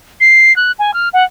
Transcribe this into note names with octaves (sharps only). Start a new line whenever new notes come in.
C7
F#6
G#5
F6
F#5